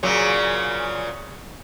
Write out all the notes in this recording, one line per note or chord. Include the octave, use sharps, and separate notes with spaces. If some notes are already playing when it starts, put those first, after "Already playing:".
A#2 C#3 F#3